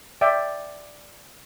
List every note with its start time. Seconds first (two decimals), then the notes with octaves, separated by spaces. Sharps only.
0.21 D5 E5 G5